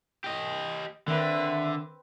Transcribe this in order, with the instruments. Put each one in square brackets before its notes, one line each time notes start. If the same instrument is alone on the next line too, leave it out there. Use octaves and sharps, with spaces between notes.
[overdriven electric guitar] G4 D#5
[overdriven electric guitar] D3 [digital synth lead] D#3 [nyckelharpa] C4 B4 [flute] E5